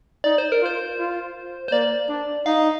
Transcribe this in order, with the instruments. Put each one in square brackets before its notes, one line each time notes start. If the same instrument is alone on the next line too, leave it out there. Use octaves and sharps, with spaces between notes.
[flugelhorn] D#4 [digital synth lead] D5
[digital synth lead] C5
A#4
[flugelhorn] F4 [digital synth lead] C5
[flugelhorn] F4
[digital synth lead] C5
[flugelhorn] A#3 [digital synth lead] D5
[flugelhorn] D4
[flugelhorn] D#4 [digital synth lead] F5